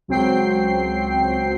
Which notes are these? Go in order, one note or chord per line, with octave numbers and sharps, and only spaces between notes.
C#2 F#3 C4 G5 C7